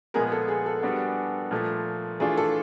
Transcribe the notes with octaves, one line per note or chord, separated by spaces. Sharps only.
A#2 F3 G#3 B3 G#4 A#4
A4
G#4
A4
G3 B3 D4 F#4
A#2 F3 A3
E3 A3 D4 F4 G#4
A4